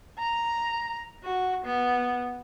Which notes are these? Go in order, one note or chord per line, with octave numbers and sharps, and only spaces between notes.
A#5
F#4
B3